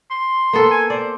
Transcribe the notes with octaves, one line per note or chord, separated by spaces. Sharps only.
C6
A#3 B3 A4
G#5
C5 D5